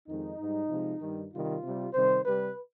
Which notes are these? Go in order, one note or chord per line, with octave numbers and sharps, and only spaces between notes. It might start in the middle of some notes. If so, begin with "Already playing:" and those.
F2 D#3 G#3 D#4
G#2 G3
C3 F3 G#3
G2 D#3 G3
C3 D#3 G3 F4
C3 G3
C3 D#3 G3 C5
C3 G3 B4